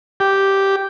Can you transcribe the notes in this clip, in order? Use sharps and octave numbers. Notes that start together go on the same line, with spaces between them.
G4